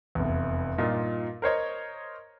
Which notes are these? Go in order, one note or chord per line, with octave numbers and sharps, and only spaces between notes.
F1 E2
G2 A#2 D#4 F4
A#4 C5 C#5 D#5